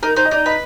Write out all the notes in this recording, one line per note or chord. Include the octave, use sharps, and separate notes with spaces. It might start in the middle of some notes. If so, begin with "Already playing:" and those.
D#4 A#4
D#4 C5
D#5
D#4 D5
B4 D#5